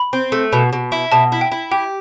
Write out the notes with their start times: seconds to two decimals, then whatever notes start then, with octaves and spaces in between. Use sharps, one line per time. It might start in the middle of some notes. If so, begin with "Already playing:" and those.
Already playing: B5
0.13 C4
0.32 A3
0.53 B2
0.73 B2
0.92 E4
1.12 B2 A5
1.32 E4
1.41 G5
1.52 E4
1.71 G4 G5